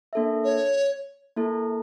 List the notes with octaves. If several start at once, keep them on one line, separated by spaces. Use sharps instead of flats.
A#3 D4 A4 E5
C#5
A#3 E4 A4